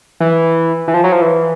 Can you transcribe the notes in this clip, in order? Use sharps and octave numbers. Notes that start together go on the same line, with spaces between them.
E3
E3
F3
F#3
F3
E3